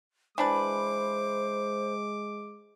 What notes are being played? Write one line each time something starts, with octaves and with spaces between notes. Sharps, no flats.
E3 G#3 D4 B4 C5 D6